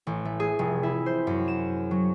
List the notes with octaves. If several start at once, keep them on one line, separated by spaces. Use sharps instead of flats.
A1
A3
G#4
F1
E4
C5
F#2
E7
F#3